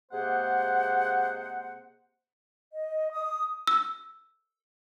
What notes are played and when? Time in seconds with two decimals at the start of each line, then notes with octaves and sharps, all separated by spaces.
0.12 C3 G#3 A#3 G#4 C5 F#5
2.72 D#5
3.11 D#6
3.67 E6